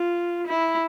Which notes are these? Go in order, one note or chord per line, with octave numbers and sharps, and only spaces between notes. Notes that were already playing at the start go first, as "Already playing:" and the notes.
Already playing: F4
E4